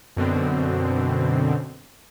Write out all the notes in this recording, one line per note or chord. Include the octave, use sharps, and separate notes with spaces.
F#2 B2 D3 C4